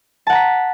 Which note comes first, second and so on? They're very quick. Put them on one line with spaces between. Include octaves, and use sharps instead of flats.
A5 F#5 A#5 B6